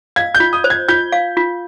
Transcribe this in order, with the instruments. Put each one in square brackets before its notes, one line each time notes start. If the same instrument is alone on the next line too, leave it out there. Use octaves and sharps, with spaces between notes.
[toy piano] F5 [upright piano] G#6
[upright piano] G6
[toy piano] F4
[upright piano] D#6
[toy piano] C5
[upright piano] G#6
[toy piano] F4 [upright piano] G6
[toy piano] F5
F4